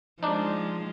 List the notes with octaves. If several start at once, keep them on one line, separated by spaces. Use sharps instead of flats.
F3 G#3 D4 D#4